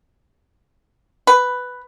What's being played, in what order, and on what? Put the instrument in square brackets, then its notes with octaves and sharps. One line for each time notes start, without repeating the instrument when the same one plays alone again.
[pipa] B4